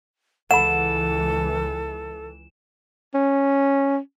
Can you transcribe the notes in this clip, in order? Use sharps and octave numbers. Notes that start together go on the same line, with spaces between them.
C#2 E3 A4 F#5 B5 E7
C#4